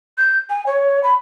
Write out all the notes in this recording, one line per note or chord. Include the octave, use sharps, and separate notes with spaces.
G6
G#5
C#5
B5